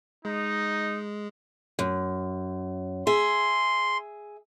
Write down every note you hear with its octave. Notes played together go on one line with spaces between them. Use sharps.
G#3 D#4
F#2
G#4 E5 C6